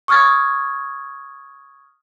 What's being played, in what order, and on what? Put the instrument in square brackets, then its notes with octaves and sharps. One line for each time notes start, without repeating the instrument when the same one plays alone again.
[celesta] C#6 D#6 F6 G#6 A6